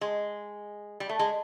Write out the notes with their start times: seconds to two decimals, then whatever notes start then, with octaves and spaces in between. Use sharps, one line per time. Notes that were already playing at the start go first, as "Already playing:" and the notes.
0.01 G#3
1.00 G3
1.09 A3
1.19 G#3